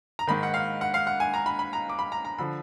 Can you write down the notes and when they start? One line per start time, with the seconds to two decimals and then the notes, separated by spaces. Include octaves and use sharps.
0.19 A#5
0.27 G#2 D#3 B5
0.43 F#5
0.54 F5
0.81 F#5
0.94 F5
1.07 F#5
1.20 G#5
1.34 A#5
1.46 B5
1.59 B5
1.73 A#5
1.89 D6
1.99 B5
2.12 A#5
2.25 A#5
2.38 D3 F3 B5